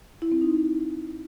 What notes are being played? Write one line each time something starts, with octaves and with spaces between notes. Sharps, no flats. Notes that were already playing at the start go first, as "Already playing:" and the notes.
E4
C4
D#4